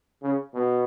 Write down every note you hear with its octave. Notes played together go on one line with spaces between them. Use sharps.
C#3
B2